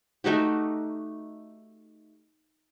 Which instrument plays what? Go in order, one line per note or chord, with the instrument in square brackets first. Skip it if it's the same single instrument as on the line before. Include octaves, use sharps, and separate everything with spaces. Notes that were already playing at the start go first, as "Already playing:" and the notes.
[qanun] A3 D#4 F#4 G4